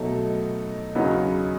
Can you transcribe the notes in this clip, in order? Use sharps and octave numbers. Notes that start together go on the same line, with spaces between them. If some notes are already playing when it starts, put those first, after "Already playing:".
Already playing: B2 F#3 A3 D#4
E2 C#3 F#3 B3 D#4